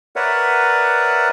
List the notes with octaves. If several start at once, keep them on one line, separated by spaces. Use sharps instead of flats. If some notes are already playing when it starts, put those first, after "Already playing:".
A#4 B4 C#5 D5 E5 F#5